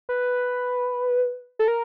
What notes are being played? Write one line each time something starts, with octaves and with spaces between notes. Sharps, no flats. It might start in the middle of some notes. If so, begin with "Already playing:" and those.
B4
A4
A#4